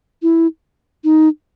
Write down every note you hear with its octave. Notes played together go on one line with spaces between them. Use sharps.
E4
D#4